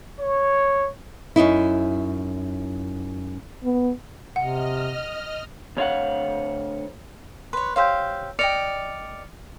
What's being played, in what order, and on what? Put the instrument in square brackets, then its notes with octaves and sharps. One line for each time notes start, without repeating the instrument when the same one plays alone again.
[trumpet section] C#5
[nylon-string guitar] F#2 C#4 D#4 E4
[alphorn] B3
[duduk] C3 [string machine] D#5 F6 [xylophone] F#5
[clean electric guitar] D2 C#5 F5 F#5
[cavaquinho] B4 C#5 [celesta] C6
[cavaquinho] G4 C5 F5 [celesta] C#5 E6 G6
[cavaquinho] D5 D#5 G5 [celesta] F6 C#7 F7